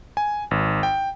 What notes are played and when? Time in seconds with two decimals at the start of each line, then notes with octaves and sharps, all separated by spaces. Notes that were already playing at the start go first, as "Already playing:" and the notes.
0.17 G#5
0.51 G#1
0.83 G5